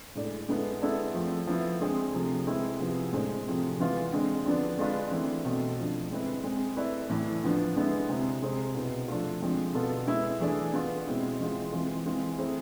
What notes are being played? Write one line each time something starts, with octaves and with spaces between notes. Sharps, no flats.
A2 G#3 D4 A4 D5
D3 G#3 B3 E4 A4
G#3 B3 E4 A4 D5
F3 A3 C4
F3 B3 E4
D3 G#3 C4 G#4
C3 F3 A3
G#3 C4 E4 B4
C3 F3 B3 E4 G#4
A2 G#3 D4 A4 C5
C3 F3 A3 C4 G#4
E3 G#3 B3 F4
D3 G#3 C4
D3 F3 B3 D4
G#3 D4 F4 B4
E3 A3 C4 E4
B2 A3 C4
D3 F3 A3
G#3 C4 E4 B4
G#3 C4 G#4
A3 E4 B4 D5
A2 E3 A3 E4
D3 F3 B3 D4
D3 G#3 B3 E4
C3 G#3 C4 E4
C3 G#3 C4 G#4 C5
B2 B3 E4
F3 A3 D4 F4
D3 F3 G#3 C4
B2 B3 F4 A4
G#3 B3 E4
E3 A3 D4 G#4 D5
B3 F4 B4
B2 G#3 C4 E4
E3 G#3 C4 F4
E3 G#3 C4 F4
E3 G#3 C4 F4 G#4
A3 C4 E4 G#4 C5